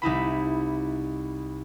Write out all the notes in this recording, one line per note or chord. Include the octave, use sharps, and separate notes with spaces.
C2 D#4 E4 B5